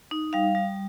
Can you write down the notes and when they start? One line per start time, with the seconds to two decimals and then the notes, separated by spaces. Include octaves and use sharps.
0.11 D#4
0.33 G3 F5
0.55 G3